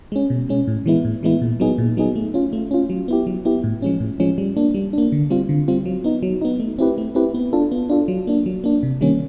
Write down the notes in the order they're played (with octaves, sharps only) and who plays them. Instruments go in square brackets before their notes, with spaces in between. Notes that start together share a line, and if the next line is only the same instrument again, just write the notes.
[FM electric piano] G#3 C#4
B2
G#3 C#4
A2
E3 G#3 B3 E4
A2
E3 G#3 B3 E4
A#2
F#3 B3 D#4 G#4
A#2
F#3 B3 D#4 G#4
A3
C#4 F4
A3
C#4 F4
F#3
B3 E4 G4
F#3
B3 E4 G4
A2
F3 G#3 C#4
A2
F3 G#3 C#4
G3
A#3 D4
G3
A#3 D4
D3
G3 C4 F4
D3
G3 C4 F4
F#3
B3 D#4
F#3
B3 D#4
A3
C4 E4 G4 B4
A3
C4 E4 G4 B4
B3
D4 F4 A4
B3
D4 F4 A4
F#3
A#3 D4
F#3
A#3 D4
C3
D#3 G3 A#3 C#4